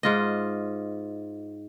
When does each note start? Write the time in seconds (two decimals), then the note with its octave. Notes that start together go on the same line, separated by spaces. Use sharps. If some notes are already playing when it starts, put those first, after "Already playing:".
0.03 G#2 F4 D#5